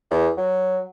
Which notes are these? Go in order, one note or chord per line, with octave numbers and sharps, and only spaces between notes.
E2
F#3